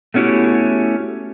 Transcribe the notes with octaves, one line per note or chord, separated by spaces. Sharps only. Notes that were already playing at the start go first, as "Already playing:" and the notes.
A3 B3 C#4 E4 F#4 G4